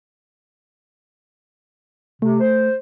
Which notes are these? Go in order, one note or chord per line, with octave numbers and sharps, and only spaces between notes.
C3 A3
C5